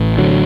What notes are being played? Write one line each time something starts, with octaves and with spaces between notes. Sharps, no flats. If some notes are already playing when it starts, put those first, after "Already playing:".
Already playing: A1 A2
D3 F#3